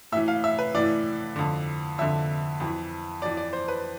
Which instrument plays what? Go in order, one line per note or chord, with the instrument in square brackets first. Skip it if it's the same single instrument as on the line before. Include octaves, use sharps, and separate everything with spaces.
[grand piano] A2 E5
E3
F5
E5
B4
A2 E3 D5
F2 D3
F2 D3 E5
F2 E3
F2 E3 D5
D5
C5
B4